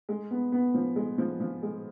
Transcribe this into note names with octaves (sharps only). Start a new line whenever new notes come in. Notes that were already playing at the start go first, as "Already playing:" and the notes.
G#3
B3
B3
F3
G#3
F3
F3
G#3